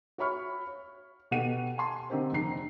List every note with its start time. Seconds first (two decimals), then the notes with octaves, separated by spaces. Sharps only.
0.18 F#4 C#5 E5 B5 C#6 F6
0.67 C#5
1.31 B2 D#3 G4 A4 F#5 D#7
1.78 G#5 A5 C6
2.10 D3 C4 D#4 G4 A#4 C5
2.32 F1 D#3 D4 A#5 C7